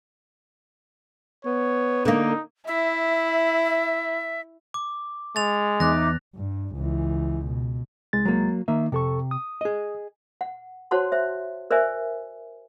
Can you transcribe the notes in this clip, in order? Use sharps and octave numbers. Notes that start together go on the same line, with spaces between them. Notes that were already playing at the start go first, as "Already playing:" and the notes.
B3 C#5
D3 A#3 D#4
E4 E5
D6
G#3 A6 F7
E2 D#4 E5 D6 F#6 A#6
G2
C#2 E3
B2
C2 G#3 A6
F#3 A#3
D#3 A#3 E5
F2 C3 A4 C#6
D#6
G#4 D#5
F#5
F#4 C5 C#5 F#5 A5 C6
C5 E5
A#4 C5 D5 E5 G#5